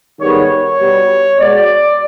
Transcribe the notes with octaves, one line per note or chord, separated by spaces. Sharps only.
G#2 D#3 G3 B3 C#5
C#5
B2 G3 B3
B2 G#3 B3 D5